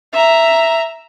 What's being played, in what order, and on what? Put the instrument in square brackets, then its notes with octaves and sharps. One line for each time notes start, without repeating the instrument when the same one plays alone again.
[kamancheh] E5 A#5